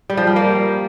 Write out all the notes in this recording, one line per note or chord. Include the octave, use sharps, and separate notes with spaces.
G3
F3
G3
A#3